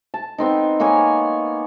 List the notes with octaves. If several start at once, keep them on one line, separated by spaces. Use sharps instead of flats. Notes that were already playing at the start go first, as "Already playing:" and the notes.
A5
B3 C4 D#4
A#3 B3 C#5 G#5